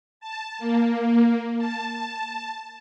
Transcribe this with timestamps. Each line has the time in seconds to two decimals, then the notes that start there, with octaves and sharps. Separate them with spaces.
0.20 A5
0.59 A#3
1.58 A5